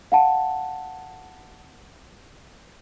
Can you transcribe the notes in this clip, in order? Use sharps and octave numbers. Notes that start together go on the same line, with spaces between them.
F5 F#5 A5